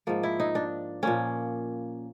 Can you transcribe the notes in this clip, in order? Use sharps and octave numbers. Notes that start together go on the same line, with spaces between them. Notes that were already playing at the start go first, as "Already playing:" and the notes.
G#2 F3 A#3
E4
D#4
D4
A#2 F3 A#3 C#4